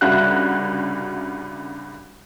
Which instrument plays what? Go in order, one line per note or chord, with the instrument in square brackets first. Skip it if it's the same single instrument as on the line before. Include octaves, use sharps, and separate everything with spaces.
[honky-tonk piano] C2 G2 C#3 F#4 E5 F#6